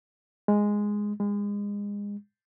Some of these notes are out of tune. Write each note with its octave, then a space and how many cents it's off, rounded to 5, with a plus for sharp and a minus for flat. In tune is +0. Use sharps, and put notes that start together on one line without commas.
G#3 -5
G#3 -30